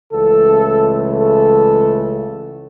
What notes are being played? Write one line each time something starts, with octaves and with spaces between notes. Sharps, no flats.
C#2 C#3 E3 A3 A4
A4